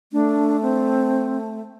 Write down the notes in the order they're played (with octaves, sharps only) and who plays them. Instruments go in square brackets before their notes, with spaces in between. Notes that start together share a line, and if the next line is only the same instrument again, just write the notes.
[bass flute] A3 [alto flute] D4
[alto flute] C4